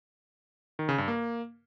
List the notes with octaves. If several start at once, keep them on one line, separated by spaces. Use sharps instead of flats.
D#3
C#3
G2
A#3